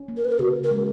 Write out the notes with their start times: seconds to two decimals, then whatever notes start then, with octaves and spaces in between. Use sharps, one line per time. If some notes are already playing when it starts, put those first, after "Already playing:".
Already playing: C#4
0.08 A#3
0.17 A#4
0.25 B4
0.32 A#4
0.39 C#3 F#4
0.64 A#4
0.71 G#3